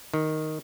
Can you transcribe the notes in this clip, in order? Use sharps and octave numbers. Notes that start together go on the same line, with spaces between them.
D#3